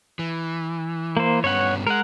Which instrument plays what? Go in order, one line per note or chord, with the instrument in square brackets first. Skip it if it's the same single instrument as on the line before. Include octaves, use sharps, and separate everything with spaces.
[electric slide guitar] E3
[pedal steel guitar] A#3 C5
[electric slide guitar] G2 B3 C#4 [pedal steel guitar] C#5 F#5
[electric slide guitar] G#3 [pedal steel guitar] A#4 F#5